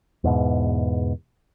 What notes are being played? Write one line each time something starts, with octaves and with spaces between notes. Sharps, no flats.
E2 G#2 B2